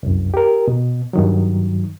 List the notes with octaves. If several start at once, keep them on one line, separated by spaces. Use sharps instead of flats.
C2 F#2
G4 A#4
B2
G2 D#3 F#3